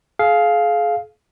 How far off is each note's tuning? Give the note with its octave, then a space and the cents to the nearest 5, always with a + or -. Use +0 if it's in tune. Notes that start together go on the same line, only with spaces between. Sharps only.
G#4 +40 F5 +0